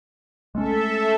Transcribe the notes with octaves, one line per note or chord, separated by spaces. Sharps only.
G#3 A3 C#4 A4 E5